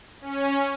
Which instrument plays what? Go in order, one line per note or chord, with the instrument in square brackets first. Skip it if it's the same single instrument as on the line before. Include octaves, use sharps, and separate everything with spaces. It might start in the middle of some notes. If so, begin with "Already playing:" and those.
[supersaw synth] C#4